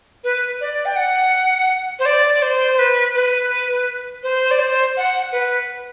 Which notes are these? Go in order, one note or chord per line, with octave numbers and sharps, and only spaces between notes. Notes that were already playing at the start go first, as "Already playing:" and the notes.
B4
D5
G5
F#5
C5
D5
D5
C5
C5
B4
B4
C5
D5
C5
F#5
B4